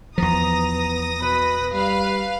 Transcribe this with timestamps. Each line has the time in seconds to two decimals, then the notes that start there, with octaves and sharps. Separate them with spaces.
0.18 E2 F3 B3 A#5 D#6 A#6
1.21 B2 B4
1.73 G3 B4 F5